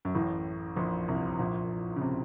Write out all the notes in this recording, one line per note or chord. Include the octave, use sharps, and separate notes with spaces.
F#2
A1 A2
A#1 A#2
C2 C3
A#1 A#2
C#3
C3